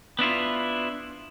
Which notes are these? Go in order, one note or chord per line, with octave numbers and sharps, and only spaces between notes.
B3 D4 E4 F4